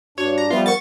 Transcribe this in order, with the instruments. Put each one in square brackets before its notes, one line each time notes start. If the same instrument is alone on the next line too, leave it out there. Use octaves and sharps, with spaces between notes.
[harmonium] G2 D4 [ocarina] F#4 [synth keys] C#5
[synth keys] A#5
[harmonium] F3 G3 B3 [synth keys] F4 [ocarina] E5
[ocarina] A#4 [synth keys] C#6 A6